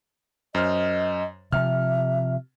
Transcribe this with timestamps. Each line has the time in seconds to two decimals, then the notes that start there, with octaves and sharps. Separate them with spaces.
0.55 F#2 C5 D#5 F6
1.53 C3 F3 E5 F6